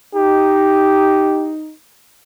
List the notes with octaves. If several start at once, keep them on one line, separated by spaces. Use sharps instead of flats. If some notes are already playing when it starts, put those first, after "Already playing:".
D#4 G4